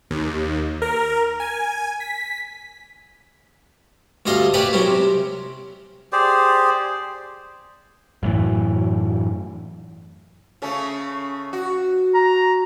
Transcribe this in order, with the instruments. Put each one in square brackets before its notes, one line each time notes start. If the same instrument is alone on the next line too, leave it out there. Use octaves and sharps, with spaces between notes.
[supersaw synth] D#2
A#4
G#5
B6
[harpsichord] D2 G2 A4 D#5 F5 C6
A#3 G4 B4 C#5 D5 G#5
F#3 B3 C#4 E4
C3
[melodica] G4 G#4 C5 D5
[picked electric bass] F#2 A2 E3
[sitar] C#3 A3 C#4
F#4
[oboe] A#5